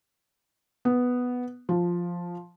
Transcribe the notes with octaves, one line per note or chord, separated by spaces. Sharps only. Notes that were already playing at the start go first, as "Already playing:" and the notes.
B3
F3